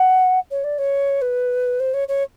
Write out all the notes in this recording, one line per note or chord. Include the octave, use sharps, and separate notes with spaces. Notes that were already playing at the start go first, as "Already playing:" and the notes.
Already playing: F#5
C#5
D5
C#5
B4
C5
C#5
C#5